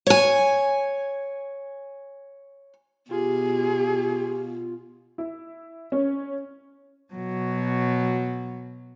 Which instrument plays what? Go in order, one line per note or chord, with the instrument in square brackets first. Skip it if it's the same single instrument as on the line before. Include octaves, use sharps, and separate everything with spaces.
[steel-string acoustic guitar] C#5 G#5
[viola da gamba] B2 [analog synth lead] F4 [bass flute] G4 [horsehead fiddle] G#4
[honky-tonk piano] E4
C#4
[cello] B2 F#3